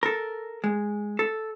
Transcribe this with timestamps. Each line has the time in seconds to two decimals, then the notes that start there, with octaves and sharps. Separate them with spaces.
0.03 A4 A#4
0.64 G#3
1.19 A4